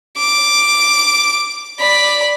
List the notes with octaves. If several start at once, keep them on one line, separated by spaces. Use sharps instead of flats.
D6
D5 B5